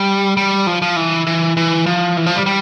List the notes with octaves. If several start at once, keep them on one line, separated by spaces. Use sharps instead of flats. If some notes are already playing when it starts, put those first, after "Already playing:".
Already playing: G3
G3
F3
F3
E3
E3
E3
F3
E3
F3
G3
G3